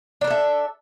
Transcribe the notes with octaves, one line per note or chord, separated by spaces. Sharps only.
D4 A4 A#4 E5